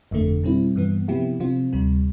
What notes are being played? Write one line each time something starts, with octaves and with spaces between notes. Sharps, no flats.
G1 F2 D3 A3
B2 G3 C4 E4
G2 E3 B3
C3 F3 B3 E4 G4
C3 F3 C4 F4
D2 C3 G3